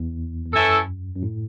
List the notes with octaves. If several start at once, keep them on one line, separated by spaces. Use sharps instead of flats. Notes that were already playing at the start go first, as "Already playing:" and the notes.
Already playing: E2
E2
F#2 E3 C#4 E4 A4
F#2
A2